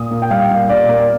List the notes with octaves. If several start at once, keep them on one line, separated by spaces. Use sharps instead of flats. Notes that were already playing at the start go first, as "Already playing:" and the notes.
Already playing: A#2 D#6
A#3
G5
G3 F5
A#2
A#2 D5
A#3